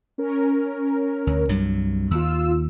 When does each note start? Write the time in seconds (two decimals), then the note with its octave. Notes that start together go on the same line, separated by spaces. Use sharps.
0.18 C#4 A#4
1.27 D2
1.49 C2 G2 F#3
2.11 D#2 F4 E6